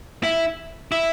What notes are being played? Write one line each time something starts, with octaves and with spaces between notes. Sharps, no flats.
E4
E4